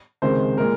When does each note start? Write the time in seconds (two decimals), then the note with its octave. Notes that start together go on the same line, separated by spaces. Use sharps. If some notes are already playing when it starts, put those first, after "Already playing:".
0.22 C#2 C3 D#3 G#3 C5
0.58 A#2 G#3 A#4